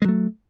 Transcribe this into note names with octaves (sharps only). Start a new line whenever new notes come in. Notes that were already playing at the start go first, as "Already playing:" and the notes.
F#3 G#3 A3